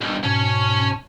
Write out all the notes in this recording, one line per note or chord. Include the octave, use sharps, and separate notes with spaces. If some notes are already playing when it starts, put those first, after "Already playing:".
B1 G2
G#2 B2 C#4 C#5 A5